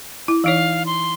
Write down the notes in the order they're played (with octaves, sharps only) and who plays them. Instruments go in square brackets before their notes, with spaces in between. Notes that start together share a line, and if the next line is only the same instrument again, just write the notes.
[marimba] E4
[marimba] E3 D#4 C#5 [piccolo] F5
[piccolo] C6